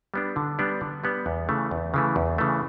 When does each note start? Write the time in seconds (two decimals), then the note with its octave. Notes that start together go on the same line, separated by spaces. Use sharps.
0.14 G3 B3 D4
0.36 D3
0.59 G3 B3 D4
0.81 D3
1.04 G3 B3 D4
1.26 E2
1.49 C#3 E3 A3
1.71 E2
1.94 C#3 E3 A3
2.16 E2
2.38 C#3 E3 A3